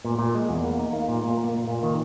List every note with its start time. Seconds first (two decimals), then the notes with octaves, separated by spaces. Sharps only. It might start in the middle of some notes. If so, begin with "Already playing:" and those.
0.05 A#2
0.19 A#2
0.35 G#3
0.49 E2
0.64 A#3
0.79 D#4
0.93 A#3
1.08 A#2
1.24 A#2
1.38 A#3
1.53 A#2
1.68 A#2
1.83 D#3